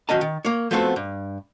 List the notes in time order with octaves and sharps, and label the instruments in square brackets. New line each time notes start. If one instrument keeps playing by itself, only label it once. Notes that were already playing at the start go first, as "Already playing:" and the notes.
[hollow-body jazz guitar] D#3 F#3 C#4 D#5 A5
D#3
A#3 C#5
F3 A3 B3 C4 F#4 A4
G2